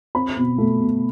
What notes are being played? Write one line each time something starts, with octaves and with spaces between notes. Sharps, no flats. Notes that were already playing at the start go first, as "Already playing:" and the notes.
C4 B5
B2
A3
B2